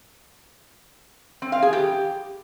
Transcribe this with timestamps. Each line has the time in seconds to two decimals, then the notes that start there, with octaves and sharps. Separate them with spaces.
1.42 C4
1.52 F5
1.62 G#4
1.73 G4